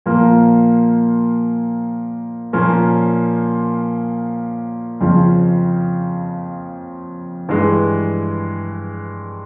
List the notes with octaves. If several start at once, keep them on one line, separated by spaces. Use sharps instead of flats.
A#2 F3 A#3
A#2 F3 A#3 C#4
F2 C#3 F3
G2 E3 G#3